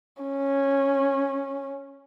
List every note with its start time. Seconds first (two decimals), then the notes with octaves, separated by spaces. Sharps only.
0.22 C#4